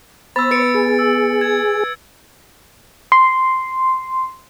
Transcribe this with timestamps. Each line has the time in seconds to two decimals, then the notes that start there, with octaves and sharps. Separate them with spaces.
0.36 B3 C5 B5 E6 A6
0.51 B4 A6 C#7 D7
0.74 G#4
0.99 E6
1.41 G#6
3.12 C6